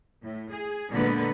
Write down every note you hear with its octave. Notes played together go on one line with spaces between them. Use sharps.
A2
G#4
A#2 D3 G#3 A#3 B3 B4